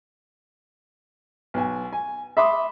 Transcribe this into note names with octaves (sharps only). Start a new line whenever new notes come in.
B1 G#5
G#5
E5 B5 C6 D6 D#6